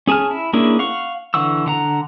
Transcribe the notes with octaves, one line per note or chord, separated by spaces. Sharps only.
C#4 G#4 G#5 A5 F6
E4
A#3 C#4 D4 E4 G#4
F5 F#5 C#6
D3 E3 F#5 C#6 E6
D3 F#5 A#5